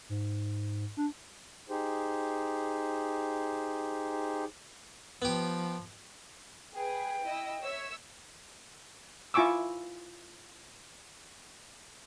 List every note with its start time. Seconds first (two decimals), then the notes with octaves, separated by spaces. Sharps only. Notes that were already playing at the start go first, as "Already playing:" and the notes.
0.09 G#2
0.97 D4
1.69 D#4 G4 G#4 C5
5.22 F3 B3 G4
6.75 G#4 B4 G5
7.24 E4 D#5 E6
7.62 C#5 E5 E6
9.34 E4 F4 G#5 C#6 D6 E6